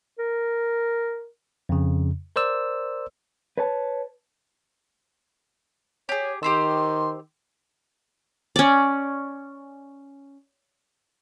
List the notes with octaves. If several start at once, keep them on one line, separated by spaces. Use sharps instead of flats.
A#4
F2 C#3
A#4 C5 D5 E6
B4 C#5 A5
G4 G#4 C#5
D#3 G4 C5 C6 E6
C#4 D5